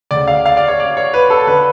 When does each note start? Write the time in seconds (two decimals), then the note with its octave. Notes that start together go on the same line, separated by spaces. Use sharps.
0.11 D2 C#3 D5
0.27 F5
0.46 F5
0.57 D5
0.68 C#5
0.80 D5
0.97 C#5
1.14 B4
1.30 A4
1.47 D3 B4